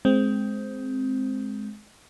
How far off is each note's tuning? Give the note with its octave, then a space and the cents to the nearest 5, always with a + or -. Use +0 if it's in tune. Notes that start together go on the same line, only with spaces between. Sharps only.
G#3 +20 C4 +0